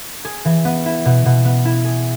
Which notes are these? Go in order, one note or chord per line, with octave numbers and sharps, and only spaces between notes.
G#4
E3
B3
E4
B2
B2
B3
E4
G#4